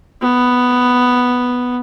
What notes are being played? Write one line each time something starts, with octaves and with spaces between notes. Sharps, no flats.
B3